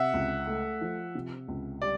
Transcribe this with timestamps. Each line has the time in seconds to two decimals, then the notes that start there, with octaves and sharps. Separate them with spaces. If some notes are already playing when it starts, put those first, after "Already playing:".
Already playing: C3 E5 F#5
0.14 C#2
0.47 A3
0.81 F3
1.15 C3
1.48 C#2
1.82 G3 D5